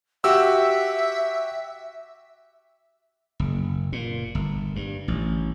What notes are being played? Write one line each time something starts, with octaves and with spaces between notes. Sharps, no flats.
F#4 G4 E5 E6
F#1
A#2
G1
G2
A1